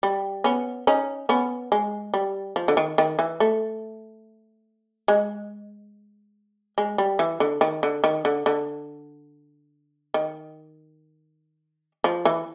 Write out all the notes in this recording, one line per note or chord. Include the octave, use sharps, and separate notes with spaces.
G3
B3 C#4
C#4 D#4
B3 C#4
G#3
G3
F3
D3
D#3
D#3
E3
A3
G#3
G#3
G3
E3
D3
D#3
D3
D#3
D3
D3
D#3
F3
E3